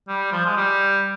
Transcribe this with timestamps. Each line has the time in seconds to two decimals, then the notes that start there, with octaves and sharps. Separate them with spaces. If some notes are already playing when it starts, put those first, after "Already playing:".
0.08 G3
0.32 F3
0.46 G#3
0.57 G3